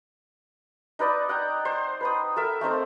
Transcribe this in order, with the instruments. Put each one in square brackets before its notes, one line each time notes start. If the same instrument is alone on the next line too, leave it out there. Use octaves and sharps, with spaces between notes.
[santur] D#4 B4 D5 D#5
F#5 G5 A#5
C5
B4 B5 D#6
A4 A#4 E5
A3 C4 D#4 C5